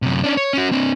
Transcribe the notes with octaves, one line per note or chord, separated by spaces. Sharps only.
F#2 C3
C#4 D4
C#5
C#4 F#4
C4 D4